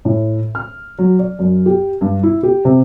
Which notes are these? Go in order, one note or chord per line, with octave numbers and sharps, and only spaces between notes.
A2
F6
F#3
D5
F#2
G4
G2
E4
G4
C3